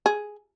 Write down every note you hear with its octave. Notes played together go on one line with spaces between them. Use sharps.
G#4